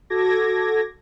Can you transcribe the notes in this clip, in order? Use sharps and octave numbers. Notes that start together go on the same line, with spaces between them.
F#4 A4 D6 G#6 A#6